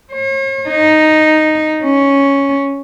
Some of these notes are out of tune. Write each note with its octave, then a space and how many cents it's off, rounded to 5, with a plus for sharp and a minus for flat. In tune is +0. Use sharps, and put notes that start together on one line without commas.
C#5 -45
D#4 -5
C#4 +0